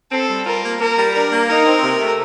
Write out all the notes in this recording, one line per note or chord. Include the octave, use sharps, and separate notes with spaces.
C4 A4
G3
F4 A#4
A#3
A#3 A#4
G3
D4 A#4
A#3
D#4 A#4
C4
C3
A3